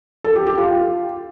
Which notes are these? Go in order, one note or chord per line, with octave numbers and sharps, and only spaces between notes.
A4
G4
G4
F4